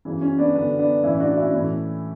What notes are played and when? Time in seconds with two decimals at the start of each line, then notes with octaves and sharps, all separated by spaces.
0.05 F#2 C#3 E3
0.21 C#4
0.38 B3 D4
0.54 F#2 D3 B3 D4
0.79 B3 D4
1.03 A2 E3 C#4 E4
1.20 D4 F#4
1.36 C#4 E4
1.53 A2 E3